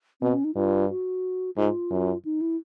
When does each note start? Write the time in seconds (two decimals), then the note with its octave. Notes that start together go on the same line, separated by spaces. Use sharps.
0.21 B2 C4
0.33 C#4
0.44 D#4
0.55 G2 F4
0.90 F#4
1.57 G#2 F4
1.91 F#2
2.25 D#4
2.41 E4